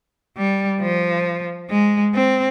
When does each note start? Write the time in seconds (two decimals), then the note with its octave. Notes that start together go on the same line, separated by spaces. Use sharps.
0.37 G3
0.81 F3
1.70 G#3
2.14 C4